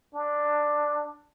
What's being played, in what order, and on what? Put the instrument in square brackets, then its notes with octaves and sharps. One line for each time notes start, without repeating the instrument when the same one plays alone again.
[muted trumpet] D4